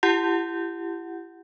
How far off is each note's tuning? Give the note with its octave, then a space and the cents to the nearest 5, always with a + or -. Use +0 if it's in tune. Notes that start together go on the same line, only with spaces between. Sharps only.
E4 +35 G4 +0 F#5 +0